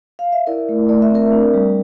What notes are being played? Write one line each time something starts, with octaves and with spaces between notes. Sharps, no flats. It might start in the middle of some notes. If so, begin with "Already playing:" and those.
F5
E5
E4 A#4 D5
A3
A3 D5
E5
C4 A#4 D5
D4
G3